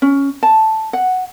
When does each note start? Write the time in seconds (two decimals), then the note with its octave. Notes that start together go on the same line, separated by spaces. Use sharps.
0.02 C#4
0.43 A5
0.93 F#5